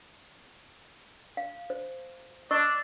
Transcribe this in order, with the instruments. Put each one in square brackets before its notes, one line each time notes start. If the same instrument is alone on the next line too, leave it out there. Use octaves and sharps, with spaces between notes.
[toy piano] F5
C5
[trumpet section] D4 [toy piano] D#5 C#6 E6